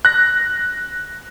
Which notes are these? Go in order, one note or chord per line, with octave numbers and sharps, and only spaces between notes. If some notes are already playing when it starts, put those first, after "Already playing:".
F#6 A#6